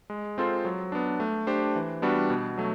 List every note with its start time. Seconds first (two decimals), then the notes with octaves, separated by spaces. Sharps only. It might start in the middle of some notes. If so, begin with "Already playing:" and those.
0.10 G#3
0.38 C4 F4 A4 C5
0.65 F#3
0.92 B3 D4
1.20 A3
1.47 D4 G4 C5
1.76 E3
2.02 G3 B3 D4 F#4
2.30 B2
2.57 F#3 A3